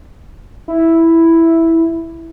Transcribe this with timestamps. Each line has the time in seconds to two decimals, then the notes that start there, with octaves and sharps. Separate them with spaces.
0.68 E4